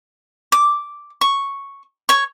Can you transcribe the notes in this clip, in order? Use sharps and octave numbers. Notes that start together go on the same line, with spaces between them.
D6
C#6
C#5 C#6